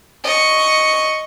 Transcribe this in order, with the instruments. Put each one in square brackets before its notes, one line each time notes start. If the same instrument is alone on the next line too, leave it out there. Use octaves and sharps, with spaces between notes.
[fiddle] D#5 C#6